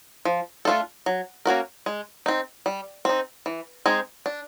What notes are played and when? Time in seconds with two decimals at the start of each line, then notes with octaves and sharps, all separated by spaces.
0.25 F3
0.65 A3 D4 F4 A4
1.06 F#3
1.46 A#3 C#4 F#4 A#4
1.86 G#3
2.26 C4 D#4
2.66 G3
3.05 C4 D#4
3.46 E3
3.86 G#3 C4 D#4 G#4
4.26 D4